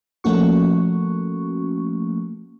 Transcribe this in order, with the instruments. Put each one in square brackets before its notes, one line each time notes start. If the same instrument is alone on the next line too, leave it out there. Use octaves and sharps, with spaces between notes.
[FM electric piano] F3 A3 A#3 C#4 F#4 C#6